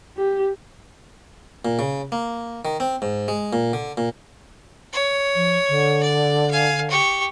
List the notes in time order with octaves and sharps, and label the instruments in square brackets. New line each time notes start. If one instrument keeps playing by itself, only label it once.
[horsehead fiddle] G4
[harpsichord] A#2
C#3
A#3
D#3
C4
G#2
G#3
A#2
D3
A#2
[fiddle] C#5
[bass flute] F3
D3
[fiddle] D5
F5 G#5
G4 C#6